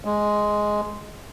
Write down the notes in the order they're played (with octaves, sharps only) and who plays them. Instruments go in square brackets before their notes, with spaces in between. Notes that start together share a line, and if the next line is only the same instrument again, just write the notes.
[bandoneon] G#3